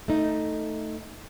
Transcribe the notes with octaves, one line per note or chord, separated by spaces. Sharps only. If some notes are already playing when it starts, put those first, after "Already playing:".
A3 D#4